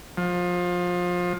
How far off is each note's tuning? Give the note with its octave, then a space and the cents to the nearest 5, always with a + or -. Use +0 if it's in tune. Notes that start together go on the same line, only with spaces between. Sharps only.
F3 +25